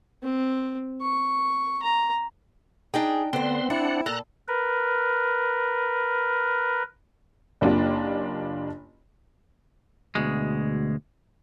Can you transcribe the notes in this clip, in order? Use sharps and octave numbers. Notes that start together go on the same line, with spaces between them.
C4
C#6
A#5
D4 D#4 G#4 G5
D2 D3 B3 C4 C6
D4 E4 F#5
A#2 A4 A#5 F#6
A#4 B4
F#1 A#3 D4 F4 G4
D2 B2 G#3